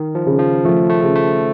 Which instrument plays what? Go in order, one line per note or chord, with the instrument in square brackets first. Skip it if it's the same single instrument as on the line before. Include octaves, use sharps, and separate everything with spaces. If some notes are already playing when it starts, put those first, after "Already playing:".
Already playing: [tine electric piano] D#3
F3
[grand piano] C#3
[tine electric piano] F3
[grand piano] F3 [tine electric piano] A3
[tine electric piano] A3
[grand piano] C#3
[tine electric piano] A3